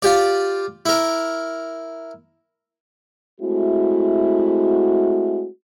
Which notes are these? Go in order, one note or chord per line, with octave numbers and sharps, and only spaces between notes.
F4 G4 D5
E4 A#4
G#3 A3 C4 E4 F#4